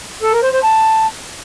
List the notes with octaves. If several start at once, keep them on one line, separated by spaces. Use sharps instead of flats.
A4
A#4
C5
C5
A5